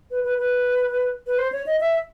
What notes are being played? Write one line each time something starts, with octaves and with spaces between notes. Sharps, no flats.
B4
B4
B4
B4
C5
C#5
D#5
E5